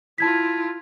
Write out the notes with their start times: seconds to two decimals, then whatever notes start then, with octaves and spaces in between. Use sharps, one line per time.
0.18 E4 F4 A5 G#6 B6